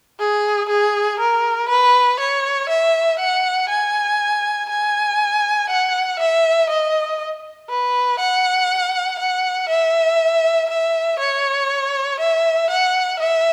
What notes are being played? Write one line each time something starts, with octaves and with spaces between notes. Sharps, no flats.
G#4
G#4
A#4
B4
C#5
E5
F#5
G#5
G#5
F#5
E5
D#5
B4
F#5
F#5
E5
E5
C#5
E5
F#5
E5